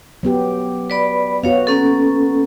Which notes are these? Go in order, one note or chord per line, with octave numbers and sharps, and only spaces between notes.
F#3 B3 G4
B4 D5 B5
B3 F#4 C#5 F5
A#3 C#4 A4